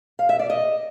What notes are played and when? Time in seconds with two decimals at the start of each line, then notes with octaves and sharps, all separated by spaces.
0.19 F5
0.29 E5
0.39 D5
0.50 D#5